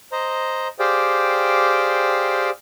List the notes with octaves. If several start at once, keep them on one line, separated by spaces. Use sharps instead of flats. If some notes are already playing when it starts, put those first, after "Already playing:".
C5 D#5 A#5
G4 G#4 C5 D5 F5 G5